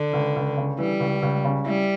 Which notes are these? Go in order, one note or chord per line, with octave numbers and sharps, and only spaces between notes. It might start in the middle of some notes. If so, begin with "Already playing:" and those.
Already playing: D3
C#2
C#2
C#3
E3 G3
C#2
C#2
C#3
G3 E4